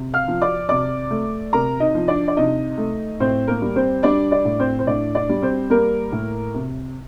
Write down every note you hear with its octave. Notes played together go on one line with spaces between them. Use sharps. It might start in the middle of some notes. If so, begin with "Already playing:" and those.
Already playing: C3
F5 F6
F3
D5 D6
C3 D5 D6
A3
C3 A#4 A#5
D#4 D#5
F3
D4 D5
D5
C3 D#4 D#5
A3
A2 C4 C5
A#3 A#4
G3
C4 C5
G3 D4 D5
D4 D5
A2
C4 C5
C5
A2 D4 D5
D4 D5
G3
C4 C5
G3 A#3 A#4
A2
C3